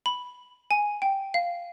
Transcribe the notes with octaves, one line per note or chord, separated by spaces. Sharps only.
B5
G#5
G5
F5